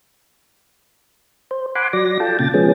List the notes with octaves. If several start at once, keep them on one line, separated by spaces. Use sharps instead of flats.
C5
F#5 G#5 B5 C6 D6
F#3 D5 A#6
F4 A4 G5 A5
A#2 C#3 G5 A6
F3 G#3 B3 C#4 G#4